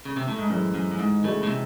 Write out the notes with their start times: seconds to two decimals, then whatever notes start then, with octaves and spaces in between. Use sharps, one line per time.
0.05 C#3
0.17 C3
0.28 A2
0.39 G#2
0.50 F#2 A2 E3 G#3 C4
0.74 F#2
0.92 F#2
0.99 G#2
1.24 A2 C#3 E3 G#3 D#4 F#4
1.43 A2
1.48 C3